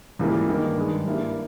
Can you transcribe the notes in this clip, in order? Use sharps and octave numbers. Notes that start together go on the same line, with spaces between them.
C#2 C#3 E3 G3 A#3
G2 D#3 A#3 D#4
G2 D#3 G#3 D#4
G2 G3 A#3 E4